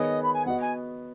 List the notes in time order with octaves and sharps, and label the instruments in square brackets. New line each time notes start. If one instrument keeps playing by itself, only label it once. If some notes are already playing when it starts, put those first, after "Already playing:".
Already playing: [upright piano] D#3 B3 G#4 C#5 [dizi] D#5
[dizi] B5
G#5
[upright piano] B3 F#4 D#5 [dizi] F#5
[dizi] G#5